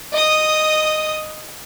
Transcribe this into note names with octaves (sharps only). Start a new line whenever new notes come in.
D#5 D#6